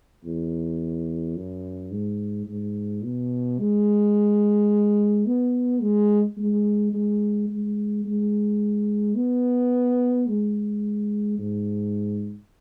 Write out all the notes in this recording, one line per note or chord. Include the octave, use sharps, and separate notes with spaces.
E2
F#2
G#2
G#2
B2
G#3
B3
G#3
G#3
G#3
G#3
G#3
B3
G#3
G#2